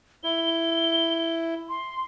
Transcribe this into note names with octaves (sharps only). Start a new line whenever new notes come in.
E4 G7
C6